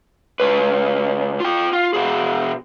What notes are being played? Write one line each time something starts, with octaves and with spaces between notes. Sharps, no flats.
C#2 B4
F4 G5
F4
B2 G#4